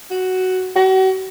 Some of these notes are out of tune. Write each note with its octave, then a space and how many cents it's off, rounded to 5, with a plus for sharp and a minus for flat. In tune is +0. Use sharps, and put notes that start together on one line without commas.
F#4 +5
F#4 +40